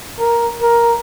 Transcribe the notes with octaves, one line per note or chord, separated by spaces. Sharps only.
A#4
A#4